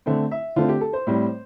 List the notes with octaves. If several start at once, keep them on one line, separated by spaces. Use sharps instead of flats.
D3 A3 C4
E5
D3 A3 C4 F4
G4
A4
C5
A2 G3 C4